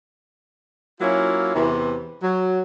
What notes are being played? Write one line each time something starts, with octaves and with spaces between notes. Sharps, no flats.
F#3 A#3 C#4 E4 F4
E2 C3 E3
F#3